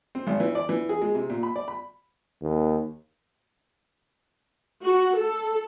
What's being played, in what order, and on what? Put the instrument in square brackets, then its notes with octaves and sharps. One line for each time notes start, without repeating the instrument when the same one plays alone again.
[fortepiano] C4
G#1
E3
D5
E3
G#4
G#3
C3
A#2
B5
D5
B5
[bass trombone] D#2
[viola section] F#4
A4